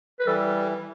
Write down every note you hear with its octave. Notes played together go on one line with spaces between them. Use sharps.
B4
E3 G3 A4